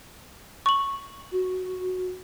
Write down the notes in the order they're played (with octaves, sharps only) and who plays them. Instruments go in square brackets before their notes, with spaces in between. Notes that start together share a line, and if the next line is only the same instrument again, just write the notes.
[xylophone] C#6 F#7
[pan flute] F#4